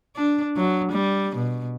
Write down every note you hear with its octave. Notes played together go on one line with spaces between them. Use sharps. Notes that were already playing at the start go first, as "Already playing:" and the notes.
D4
F#3
G3
B2